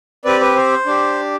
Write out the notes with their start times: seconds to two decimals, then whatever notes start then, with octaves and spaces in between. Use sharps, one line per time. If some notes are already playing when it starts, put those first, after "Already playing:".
0.25 C4 G4 B4 D5
0.41 B4
0.56 C5
0.86 D4 G4